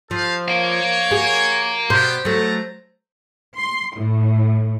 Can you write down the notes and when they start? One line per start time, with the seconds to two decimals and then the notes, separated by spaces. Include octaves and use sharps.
0.11 F3 A4 C5 F5
0.48 A#4 C#5 F5
1.11 F#4 G#4
1.90 B2 G3 B3 G4 C5
2.25 F#3 A3 B3 A5 A#5
3.56 C6
3.96 A2